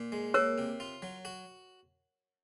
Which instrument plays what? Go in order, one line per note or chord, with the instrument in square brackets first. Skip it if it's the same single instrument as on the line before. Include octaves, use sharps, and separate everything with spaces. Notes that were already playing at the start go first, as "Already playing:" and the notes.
Already playing: [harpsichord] A#2
G#3
[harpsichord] A#3 [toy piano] A#4 C#5
[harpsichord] C3
F4
F#3
F#4